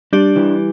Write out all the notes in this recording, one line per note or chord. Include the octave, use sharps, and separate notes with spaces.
G3 D4 G4
E3